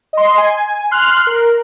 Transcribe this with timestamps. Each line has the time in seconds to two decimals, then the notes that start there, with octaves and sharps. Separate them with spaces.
0.13 D#5 C6
0.38 G#5
0.91 C6 F6 F#6
1.27 A#4